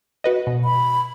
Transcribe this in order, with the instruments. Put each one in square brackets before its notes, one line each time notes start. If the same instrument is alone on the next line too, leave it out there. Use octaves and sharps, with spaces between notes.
[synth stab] F#4 B4 D#5
B2
[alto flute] B5